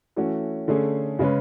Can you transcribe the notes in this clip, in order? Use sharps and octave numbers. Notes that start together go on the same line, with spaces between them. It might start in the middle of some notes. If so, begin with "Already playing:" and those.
E3 A3 C#4 F#4
D3 A3 C#4 G#4
C#3 G#3 C#4 G#4 B4